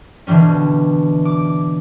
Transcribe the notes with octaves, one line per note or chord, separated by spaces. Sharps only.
B2 D3 E3 G3 C#4
D6